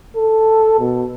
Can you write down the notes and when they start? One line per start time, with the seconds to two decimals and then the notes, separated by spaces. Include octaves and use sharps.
0.16 A4
0.79 B2